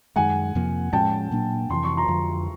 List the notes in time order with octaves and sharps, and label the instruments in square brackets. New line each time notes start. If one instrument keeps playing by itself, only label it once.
[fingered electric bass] F#2 D#3 G#3 [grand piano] F#5 G#5
[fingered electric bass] F2 C3 F3 A#3
[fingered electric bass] A2 F3 G#3 C#4 [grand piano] G5 A5
[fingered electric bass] A#2 F#3 A#3 D4
[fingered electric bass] F2 C3 E3 [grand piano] C6
[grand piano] C#6
A#5 C6
[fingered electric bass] F2 D3 F3